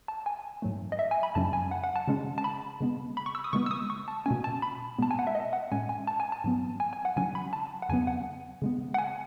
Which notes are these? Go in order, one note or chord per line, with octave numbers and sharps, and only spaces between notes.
A5
G#5
G#2 F#3 A3
D#5
E5
G#5
B5
F#2 C#3 F#3 C#4 A5
G#5
F#5
F#5
A5
C#3 G#3 C#4
A5
B5
C#3 G#3 B3
B5
C#6
E6
D#6
C#3 G#3 B3 C#6
E6
D#6
C#6
A5
B2 A3 C#4 G#5
A5
B5
B2 G#3 B3 A5
G#5
F#5
E5
D#5
F#5
A2 G#3 C#4 G#5
G#5
A5
G#5
A5
G#2 F#3 B3
G#5
G#5
F#5
C#3 F#3 C#4 G#5
B5
A5
F#5
E2 C#3 F#3 B3 G#5
F#5
C#3 G#3 B3
F#5
G#5